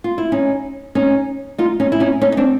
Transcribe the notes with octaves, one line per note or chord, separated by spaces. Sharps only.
F4
E4
C#4 D#4
C#4 D#4
D#4 F4
C#4 D#4
E4
C#4 D#4
C#4 D#4
D#4
C4 D4